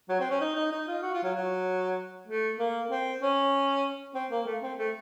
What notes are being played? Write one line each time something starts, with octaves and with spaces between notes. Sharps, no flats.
F#3
C4
C#4
D#4
D#4
D#4
F4
F#4
F4
F#3
F#3
A3
A#3
C4
C#4
C4
A#3
A3
C4
A3